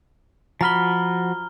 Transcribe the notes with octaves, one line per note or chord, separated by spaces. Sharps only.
F3 F#4 A#5 B5 F6 G7